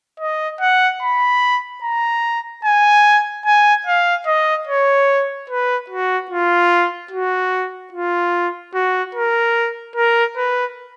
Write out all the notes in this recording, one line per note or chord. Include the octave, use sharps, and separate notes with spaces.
D#5
F#5
B5
A#5
G#5
G#5
F5
D#5
C#5
B4
F#4
F4
F#4
F4
F#4
A#4
A#4
B4